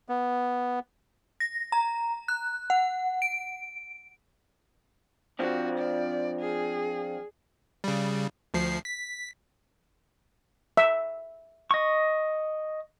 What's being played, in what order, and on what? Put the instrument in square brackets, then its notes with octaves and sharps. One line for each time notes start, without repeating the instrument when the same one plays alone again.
[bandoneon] B3
[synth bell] A#6
A#5
F#6
F#5
D7
[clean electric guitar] F3 C4 D4 [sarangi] F#4
[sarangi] D5
G#4
[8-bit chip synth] C#3 G3
D2 F3 C7
B6
[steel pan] E5
[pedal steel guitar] D#5 C#6